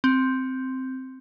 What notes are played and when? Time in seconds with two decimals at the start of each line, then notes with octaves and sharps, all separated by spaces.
0.04 C4